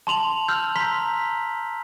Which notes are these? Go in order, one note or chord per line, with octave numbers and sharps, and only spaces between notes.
A5 C6 F7 F#7
E6 F6 G6
A#5 C6 B6